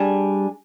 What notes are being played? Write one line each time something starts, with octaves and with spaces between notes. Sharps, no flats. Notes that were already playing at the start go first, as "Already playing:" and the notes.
Already playing: G3 D4 G#4